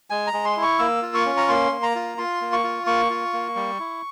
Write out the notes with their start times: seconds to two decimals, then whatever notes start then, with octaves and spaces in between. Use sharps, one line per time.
0.10 G#3 G#5
0.27 A#5
0.33 G#3
0.45 C6
0.57 E4
0.62 C#6
0.79 A#3 E6
1.02 F4
1.14 C#6
1.25 C#4
1.37 A#5
1.49 A#3 C6
1.72 A#3
1.83 A#5
1.95 F4
2.18 F4 C6
2.41 A#3
2.53 C#6
2.64 F4
2.86 A#3 C#6
3.10 F4
3.33 A#3
3.56 G3
3.79 E4